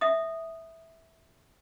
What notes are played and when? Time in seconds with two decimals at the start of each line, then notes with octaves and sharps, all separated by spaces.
0.01 E5 D#6